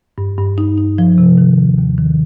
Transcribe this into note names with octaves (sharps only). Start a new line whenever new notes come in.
G2
G2
D#4
D#4
F3
C3
D#3
D#2
D#2
D#3